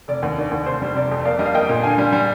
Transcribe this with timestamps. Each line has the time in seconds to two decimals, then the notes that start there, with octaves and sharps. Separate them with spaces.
0.08 F1 D5
0.22 D#2
0.38 D#3 D5
0.51 D#2
0.66 F1 C5
0.82 G3
0.95 C3 D5
1.11 F2
1.25 A#3 D5 F5
1.39 G3 D#5
1.46 F5
1.54 A#3 D#5 G5
1.69 A#2
1.83 D3 F5 G#5
1.98 G3
2.13 G3